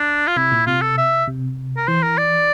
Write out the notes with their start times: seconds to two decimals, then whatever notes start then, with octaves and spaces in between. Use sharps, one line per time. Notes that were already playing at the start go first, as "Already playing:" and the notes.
Already playing: D4
0.27 F4
0.37 C3 E4
0.52 A#2
0.66 C3 F4
0.81 A4
0.98 E5
1.28 C3
1.77 A#4
1.88 E3 C5
2.03 A#4
2.18 D5